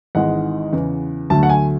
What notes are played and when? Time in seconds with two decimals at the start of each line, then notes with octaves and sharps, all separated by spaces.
0.15 G#1 G#2 E3 G#3 F#5
0.73 E2 C#3 E3
1.30 D2 D3 F#3 A3 A5
1.43 F#5
1.50 G#5